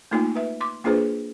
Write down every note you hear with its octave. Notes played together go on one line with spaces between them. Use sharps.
A3 A#3 D#4 F4 G#5
B4 E5
C6 D6
A#3 D4 F4 G#4 B4 C5